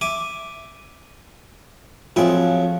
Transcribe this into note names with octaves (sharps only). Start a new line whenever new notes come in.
E5 G#5 D6
F2 F3 F#3 F4 G#4 E5 G5